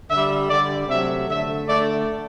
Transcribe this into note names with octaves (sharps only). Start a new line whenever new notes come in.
D3 G3 E5
D3 G3 D5
C3 F#3 A3 E5
D3 A3 E5
D3 A3 D5